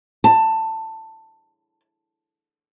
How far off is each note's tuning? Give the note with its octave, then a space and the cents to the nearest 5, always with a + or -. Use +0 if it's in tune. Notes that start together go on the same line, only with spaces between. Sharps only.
A5 +15